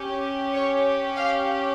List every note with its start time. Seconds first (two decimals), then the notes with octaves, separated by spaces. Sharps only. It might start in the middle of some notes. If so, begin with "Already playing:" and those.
Already playing: C#4 G4
0.54 C#5
1.16 F5